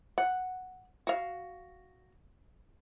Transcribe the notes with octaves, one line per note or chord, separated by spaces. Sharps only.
F#5
F#4 F5